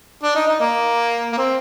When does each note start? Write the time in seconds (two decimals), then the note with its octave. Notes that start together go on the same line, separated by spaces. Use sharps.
0.23 D4
0.35 D#4
0.47 D#4
0.60 A#3
1.32 A#3
1.37 C4